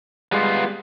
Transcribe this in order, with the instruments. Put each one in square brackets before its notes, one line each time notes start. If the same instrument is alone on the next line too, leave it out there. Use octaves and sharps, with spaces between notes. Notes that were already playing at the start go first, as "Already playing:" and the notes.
[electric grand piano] G3 G#3 G4 [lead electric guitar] B3 F4